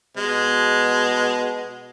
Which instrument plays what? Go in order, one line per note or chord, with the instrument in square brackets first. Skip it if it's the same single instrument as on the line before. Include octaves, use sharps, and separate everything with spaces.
[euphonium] B2 [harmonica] G#3